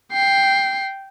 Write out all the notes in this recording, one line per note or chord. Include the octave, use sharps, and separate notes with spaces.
G5 C7